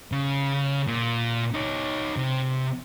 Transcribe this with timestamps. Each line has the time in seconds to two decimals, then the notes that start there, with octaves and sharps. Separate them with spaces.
0.12 C#3
0.87 A#2
1.54 D#4 C#5
2.17 C3